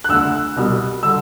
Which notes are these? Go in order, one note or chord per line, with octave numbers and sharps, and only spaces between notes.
F#6
D2 D3 A3 E6
C2 B2 G3
D3 G3 E6